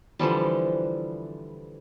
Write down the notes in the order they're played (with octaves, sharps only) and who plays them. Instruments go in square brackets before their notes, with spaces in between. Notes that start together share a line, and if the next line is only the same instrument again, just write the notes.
[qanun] D3 E3 F3 G3